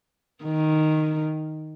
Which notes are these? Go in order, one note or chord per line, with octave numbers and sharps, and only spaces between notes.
D#3